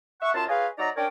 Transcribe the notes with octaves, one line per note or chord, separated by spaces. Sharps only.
E5 F#5 C#6
F#2 F4 A5
F4 G#4 B4 C#5 D#5 F5
F#3 D#4 D5 A#5
C#4 D4 A#4 C#5 D5 G5